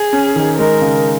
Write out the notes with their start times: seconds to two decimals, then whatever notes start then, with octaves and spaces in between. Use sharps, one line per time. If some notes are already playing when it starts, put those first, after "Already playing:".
Already playing: G#4
0.13 C#4
0.36 D#3
0.59 G#3 A#4
0.81 C#3